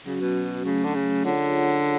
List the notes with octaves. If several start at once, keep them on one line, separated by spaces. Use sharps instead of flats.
C#3 F#3 C#4 F#4
B2
C#3 F#3 A3 C#4
D3
C#3
D3 F4 G#4 C#5 F#5